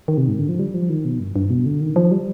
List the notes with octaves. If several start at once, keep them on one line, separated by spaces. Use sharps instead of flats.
D#3
C3
G#2
D3
F3
G3
F3
D#3
B2
G2
G2
B2
D3
D#3
F3
G3